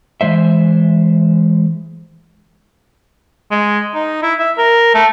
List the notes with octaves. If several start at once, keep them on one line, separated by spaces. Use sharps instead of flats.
E3 G#3 C5 E5
G#3
D#4
E4
E5
A#4
A3